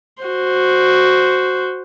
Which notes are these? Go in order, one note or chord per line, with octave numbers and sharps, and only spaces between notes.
F#4 C5